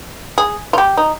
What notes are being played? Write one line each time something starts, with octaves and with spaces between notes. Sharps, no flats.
G#4
F4
G4
D#4